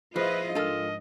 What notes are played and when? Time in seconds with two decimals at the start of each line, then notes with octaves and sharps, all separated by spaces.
0.16 F3 E4 F4 G#4 B4 D#5
0.55 G#2 F3 D4 F4 A4 A#4 D#5 F6